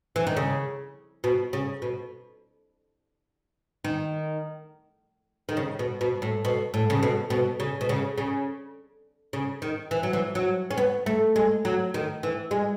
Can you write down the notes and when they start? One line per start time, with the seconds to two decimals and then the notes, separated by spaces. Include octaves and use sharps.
0.16 E3
0.27 D#3
0.37 C#3
1.24 B2
1.53 C#3
1.82 B2
3.84 D#3
5.49 D#3
5.57 C#3
5.79 B2
6.01 B2
6.22 A2
6.45 B2
6.74 A2
6.90 C#3
7.03 B2
7.30 B2
7.60 C#3
7.81 B2
7.89 C#3
8.18 C#3
9.33 C#3
9.62 D#3
9.91 E3
10.03 F#3
10.13 E3
10.35 F#3
10.71 C#4
10.78 B3
11.06 A3
11.36 G#3
11.65 F#3
11.94 D#3
12.23 E3
12.51 G#3